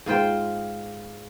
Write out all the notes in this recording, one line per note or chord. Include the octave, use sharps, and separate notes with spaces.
G#2 F4 C5 G5